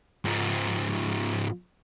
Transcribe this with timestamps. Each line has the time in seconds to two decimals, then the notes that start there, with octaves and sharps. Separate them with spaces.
0.25 G#2 F3